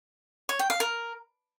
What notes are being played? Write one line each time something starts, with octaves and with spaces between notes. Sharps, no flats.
C#5
G5
F5
A#4